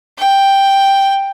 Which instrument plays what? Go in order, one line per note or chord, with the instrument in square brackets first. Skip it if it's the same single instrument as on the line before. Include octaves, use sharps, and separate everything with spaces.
[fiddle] G5